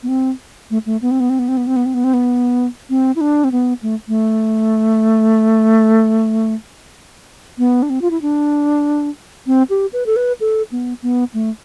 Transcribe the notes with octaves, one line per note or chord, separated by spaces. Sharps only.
B3
C4
A3
A3
B3
C4
B3
C4
B3
C4
B3
C4
B3
C4
B3
C4
B3
C4
E4
D4
C4
B3
A3
A3
B3
D4
C4
F4
E4
D4
C4
G4
B4
A4
B4
A4
B3
B3
A3